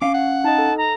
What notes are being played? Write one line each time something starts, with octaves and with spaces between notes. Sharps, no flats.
C#4 F5 D6
F#5
D#4 D#5 A5
A4
A#5